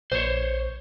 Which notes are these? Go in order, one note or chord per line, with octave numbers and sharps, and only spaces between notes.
A#1 C5 C#5